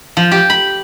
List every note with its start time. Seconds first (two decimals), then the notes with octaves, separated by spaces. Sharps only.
0.17 F3
0.31 G4
0.50 B5